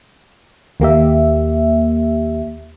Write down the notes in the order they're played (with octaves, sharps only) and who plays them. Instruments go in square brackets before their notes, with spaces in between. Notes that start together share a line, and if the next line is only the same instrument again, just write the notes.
[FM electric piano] D#2 A#3 G4 E5